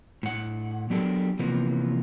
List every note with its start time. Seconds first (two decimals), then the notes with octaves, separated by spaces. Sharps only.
0.23 A2 F#5
0.90 F#3 B3 D4 G4 A4 A#4
1.39 C3 E3 F3 A#3 B3